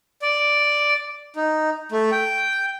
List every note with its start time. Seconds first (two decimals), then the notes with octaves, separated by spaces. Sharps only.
0.22 D5
1.36 D#4
1.92 A3
2.12 G5